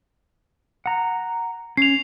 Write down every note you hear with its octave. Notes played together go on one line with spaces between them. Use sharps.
F#5 A#5
C#4 C7 F7